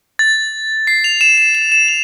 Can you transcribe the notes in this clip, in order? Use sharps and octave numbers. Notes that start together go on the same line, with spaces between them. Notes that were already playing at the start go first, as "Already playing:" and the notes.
A6
C7
F7
E7
E7
E7
E7
F7